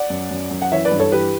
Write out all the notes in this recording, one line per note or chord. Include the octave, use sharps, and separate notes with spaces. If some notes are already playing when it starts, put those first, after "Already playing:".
Already playing: D5 F#5
F#2
F#2
F#2
F#5
E3 C#5 E5
B4 D5
G2
A4 C#5
E3 G4 B4